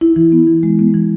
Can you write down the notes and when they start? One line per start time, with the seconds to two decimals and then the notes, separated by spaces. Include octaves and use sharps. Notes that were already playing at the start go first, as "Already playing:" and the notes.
0.01 E4
0.16 E3
0.32 B3
0.47 E3
0.63 G#3
0.79 B3
0.94 E3